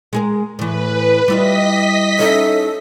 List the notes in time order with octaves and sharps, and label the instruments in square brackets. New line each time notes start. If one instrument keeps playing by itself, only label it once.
[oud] G#3 G#4 A#4
[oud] A2 E3 [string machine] B4
[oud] G3 E4 F4 [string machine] D#5 B6
[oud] C#4 D#4 E4 [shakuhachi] A4